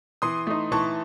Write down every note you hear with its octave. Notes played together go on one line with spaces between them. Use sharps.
E3 C6 D#6
A3 D#4
E3 A5 C#6